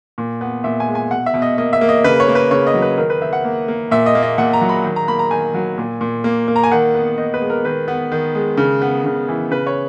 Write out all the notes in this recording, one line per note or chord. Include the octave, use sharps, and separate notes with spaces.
A#2
B3
A#2 E5
G#5
G#3
G#5
B2 F#5
E5
B2
D#5
A#3 D#5
E5
A#3
D#5
C#3 B4
C#5
A#3
B4
C#3 C#5
D#5
F#3
B4
D#3 A#4
B4
D#3 E5
F#5
A#3
A#3
A#2 E5
D#5
A#3
D#5
A#2 F#5
A#5
F#3
B5
D#3
A#5
A#3 B5
A#5
D#3 G#5
F#3
A#2
A#2
A#3
A#3
A#5
G#5
D#3 F#5
B3
D#3 D#5
B4
G#3
A#4
D#3 B4
B3
D#3
G#3
C#3
B3
C#3
E3
C#3 B4
C#5